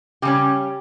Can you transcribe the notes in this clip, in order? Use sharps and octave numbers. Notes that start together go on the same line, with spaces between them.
C#3 G3 C#4 G4